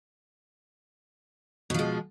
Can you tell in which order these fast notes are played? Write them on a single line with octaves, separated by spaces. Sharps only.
B2 F3 G#3